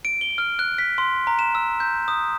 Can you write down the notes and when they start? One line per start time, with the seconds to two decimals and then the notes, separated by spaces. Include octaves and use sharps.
0.05 D7
0.21 G7
0.38 F6
0.59 F#6
0.78 B6
0.98 C6
1.27 A#5
1.39 E7
1.55 E6
1.80 G6
2.08 D#6